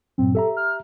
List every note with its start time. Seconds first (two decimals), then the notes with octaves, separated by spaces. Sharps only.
0.18 G2 A#2 F#3 C4
0.35 G4 A4 E5 A#5
0.57 F6